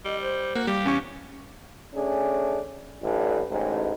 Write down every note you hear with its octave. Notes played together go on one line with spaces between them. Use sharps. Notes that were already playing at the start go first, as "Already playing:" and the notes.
G3 D#5
C5
A#3 F#4
G3 G4 F5
E2 C#4 C#6
A3 C#4 D4 G#4
A1 D3
A1 G#2